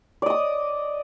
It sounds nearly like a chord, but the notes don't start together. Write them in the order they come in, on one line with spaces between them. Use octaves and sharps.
D5 D#5 D#6 D6